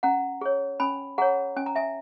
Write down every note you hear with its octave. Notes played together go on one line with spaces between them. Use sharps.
C#4 F#5 A#5
G#4 C#5
C#4 G#5 B5
G#4 C#5 F#5 A#5
C#4 G#5
A#5
E5 G#5